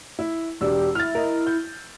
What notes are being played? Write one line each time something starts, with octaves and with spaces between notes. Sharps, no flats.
E4
E1 D4 G4 E6
E4 F6 A6
A#4 D#5
G6